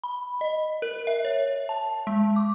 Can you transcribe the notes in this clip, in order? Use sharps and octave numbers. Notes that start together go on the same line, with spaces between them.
B5
D#5
A#4
E5
C#5
A5
G#3
D6